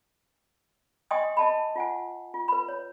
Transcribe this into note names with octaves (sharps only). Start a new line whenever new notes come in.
D#5 G5 G#5 C6 C#6 D#6
D#5 A5 B5
F4 F#5 G#5
F4
B4 B5
C#5